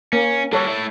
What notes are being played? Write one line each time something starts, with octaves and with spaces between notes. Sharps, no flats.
A#3 C#4
G3 F#4 A4 C#5
A3 E4